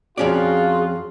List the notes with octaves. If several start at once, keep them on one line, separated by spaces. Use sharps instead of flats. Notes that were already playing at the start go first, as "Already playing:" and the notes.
F2 C#4 F4 F#4 G#4 D5